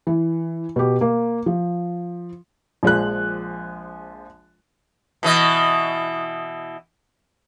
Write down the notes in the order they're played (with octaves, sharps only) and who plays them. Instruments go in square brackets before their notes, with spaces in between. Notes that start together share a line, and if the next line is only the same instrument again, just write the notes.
[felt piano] E3
B2 G4
A#3
F3
[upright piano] A#1 F3 G#3 F#6
[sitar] B2 E3 D#5